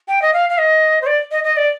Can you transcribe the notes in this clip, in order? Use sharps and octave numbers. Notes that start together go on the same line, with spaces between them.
G5
D#5
F5
F5
D#5
C5
D5
D#5
D#5
D5